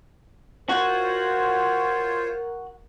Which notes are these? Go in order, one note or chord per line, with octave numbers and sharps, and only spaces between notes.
F4 F#4 A#4 C5 C#5